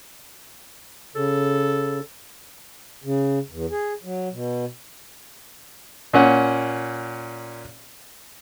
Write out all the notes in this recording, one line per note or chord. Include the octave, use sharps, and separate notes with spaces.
C#3 A4
C#3
E2
G#4
F#3
B2
A#2 C#4 F#5